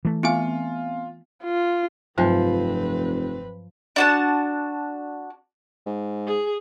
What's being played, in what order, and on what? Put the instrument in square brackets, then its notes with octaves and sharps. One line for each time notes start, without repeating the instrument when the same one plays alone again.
[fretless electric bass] E3 A3
[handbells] B3 C4 G#5 [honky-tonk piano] F4
[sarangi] F4
[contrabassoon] F1 [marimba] G2 F#3 [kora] F3 [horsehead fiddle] C4 B4
[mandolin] D4 F#4 A5
[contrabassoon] G#2
[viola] G#4